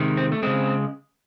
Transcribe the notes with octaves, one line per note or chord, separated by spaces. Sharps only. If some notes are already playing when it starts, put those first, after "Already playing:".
Already playing: C3 D#3 G#3
C4
A3
C#3 G#3 C4